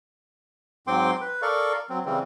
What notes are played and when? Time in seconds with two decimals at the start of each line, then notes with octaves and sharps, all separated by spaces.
0.87 G#2 F#3 C4 G5 C6 D6
1.21 B4
1.42 A4 A#4 D5 F5 C#6
1.90 F#3 C4
2.05 C#3 E3 G3 C4